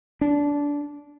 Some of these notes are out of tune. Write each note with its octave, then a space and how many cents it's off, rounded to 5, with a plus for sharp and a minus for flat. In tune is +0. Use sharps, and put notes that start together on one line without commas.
D4 -20